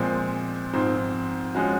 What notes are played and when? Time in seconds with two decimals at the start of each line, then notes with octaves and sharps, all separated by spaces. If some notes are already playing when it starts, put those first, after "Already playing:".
Already playing: A#2 F3 G#3 C4
0.73 G#2 F3 C4
1.55 F3 G#3 C#4 F#4